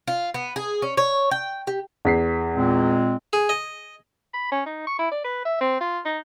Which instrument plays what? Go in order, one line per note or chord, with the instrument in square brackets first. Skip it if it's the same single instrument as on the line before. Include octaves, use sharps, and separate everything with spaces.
[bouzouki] F4
B3
G#4
C#4
C#5
G5
G4
[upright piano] E2 B6 C7
[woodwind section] A#2 G#3 C4
[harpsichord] G#4
D#5
[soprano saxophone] B5
C#4
D#4
C#6
E4
D5
B4
E5
C4
F4
D#4